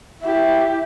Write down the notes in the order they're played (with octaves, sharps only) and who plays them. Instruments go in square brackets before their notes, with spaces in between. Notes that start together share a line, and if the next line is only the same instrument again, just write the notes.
[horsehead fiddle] E4 G4 [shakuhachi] E5